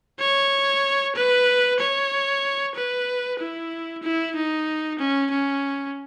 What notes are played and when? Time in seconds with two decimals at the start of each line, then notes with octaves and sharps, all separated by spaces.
0.20 C#5
1.16 B4
1.80 C#5
2.76 B4
3.39 E4
4.03 E4
4.36 D#4
4.99 C#4
5.31 C#4